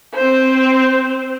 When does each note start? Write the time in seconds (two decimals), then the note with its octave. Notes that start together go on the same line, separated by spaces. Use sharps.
0.15 C4 C5